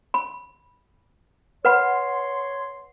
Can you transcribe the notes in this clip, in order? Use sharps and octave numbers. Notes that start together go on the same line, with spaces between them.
B5
B4 C#5 F#5 B5 C6